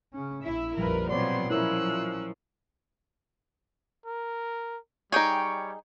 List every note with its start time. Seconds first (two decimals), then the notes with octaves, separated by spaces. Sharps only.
0.13 C#3 C#4
0.44 A#1 E4 E5
0.77 A#1 F2 A#2 F3 G3 F4 A#4 B4
1.09 B2 F3 F#3 B3 C4 C#5 D5 C6
1.50 F3 F#3 C#4 E4 A#4 C#5 E6 F#6
4.06 A#4
5.12 G3 D#4 G#4 C#5 G5